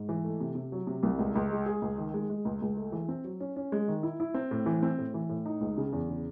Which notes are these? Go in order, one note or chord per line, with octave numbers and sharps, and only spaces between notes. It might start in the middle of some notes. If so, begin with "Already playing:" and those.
Already playing: G#2
E3
A3
C3
C3
F#3
C3
C2
C#2
C#2
G#3
G#4
C#2
D#3
G#3
G#3
C#2
C#2
A3
E3
C4
F#3
C#4
C#4
G#3
D#3
E4
E4
C4
A2
E3
C4
A2
E3
A2
D#4
C#2
C#3
E2
C#3